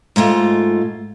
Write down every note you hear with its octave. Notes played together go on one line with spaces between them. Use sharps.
G#2 G#3 A3 F4